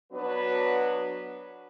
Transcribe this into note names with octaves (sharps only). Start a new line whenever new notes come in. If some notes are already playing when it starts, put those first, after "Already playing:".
F#3 B3 D4 F#4 B4